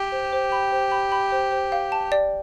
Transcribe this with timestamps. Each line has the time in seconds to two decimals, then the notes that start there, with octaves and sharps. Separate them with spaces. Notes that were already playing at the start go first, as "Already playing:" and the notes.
Already playing: G4
0.12 C5
0.32 C5
0.52 B5
0.72 C5
0.92 B5
1.12 B5
1.32 C5
1.52 C5
1.72 F5
1.92 A5
2.12 D5